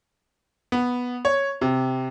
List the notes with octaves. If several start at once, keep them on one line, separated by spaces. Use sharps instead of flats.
B3
C#5
C3